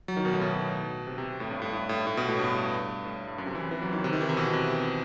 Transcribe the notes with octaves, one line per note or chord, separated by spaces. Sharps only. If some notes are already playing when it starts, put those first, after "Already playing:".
F#3
D#3
B2
A2
B2
C3
C3
A2
G2
A2
A2
A2
A2
B2
A2
G2
A2
G2
F#2
C3
E3
E3
F#3
D#3
C3
D#3
E3
C3
B2
C3